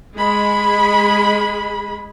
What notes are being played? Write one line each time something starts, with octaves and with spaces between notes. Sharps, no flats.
G#3 G#4 B5